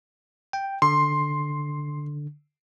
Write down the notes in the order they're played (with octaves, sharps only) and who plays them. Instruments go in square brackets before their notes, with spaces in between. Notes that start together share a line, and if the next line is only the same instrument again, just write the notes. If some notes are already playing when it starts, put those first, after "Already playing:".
[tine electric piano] G5
[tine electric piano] D3 [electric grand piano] C6